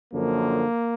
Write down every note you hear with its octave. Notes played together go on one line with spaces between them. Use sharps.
F#2 D3 F3 A#3